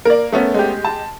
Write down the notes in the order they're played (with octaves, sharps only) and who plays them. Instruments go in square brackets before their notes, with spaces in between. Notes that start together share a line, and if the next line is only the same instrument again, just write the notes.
[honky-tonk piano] A#3 [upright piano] A#4 D5
[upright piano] A3 B3 C#4
[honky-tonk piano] G#3 G4
[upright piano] A5